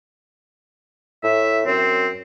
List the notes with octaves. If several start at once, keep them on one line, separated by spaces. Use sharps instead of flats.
A2 E5
F#2 C4